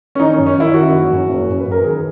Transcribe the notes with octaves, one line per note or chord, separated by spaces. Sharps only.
C#4
D#3 D#4
C#4
F#2
C#4
D#3 E4
D#3 F#4
F#1
F#2
F#1
F#2
B4
F#2
A#4
D#3 G#4